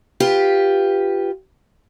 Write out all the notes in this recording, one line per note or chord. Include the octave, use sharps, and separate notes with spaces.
F4 G4 B4